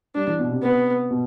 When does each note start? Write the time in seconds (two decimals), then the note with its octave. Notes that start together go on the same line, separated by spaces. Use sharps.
0.15 G3 D4
0.27 E3
0.39 B2
0.51 C3
0.63 B3
1.11 B2